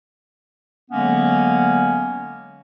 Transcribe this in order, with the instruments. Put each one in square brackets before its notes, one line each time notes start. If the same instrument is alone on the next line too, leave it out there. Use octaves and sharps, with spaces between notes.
[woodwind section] D3 F#3 G#3 A#3 B3 C#4